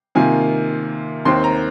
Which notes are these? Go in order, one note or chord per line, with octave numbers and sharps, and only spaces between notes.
C3 D#3 A#3 F4 G#5
D#2 D#3 C4 C6
A#5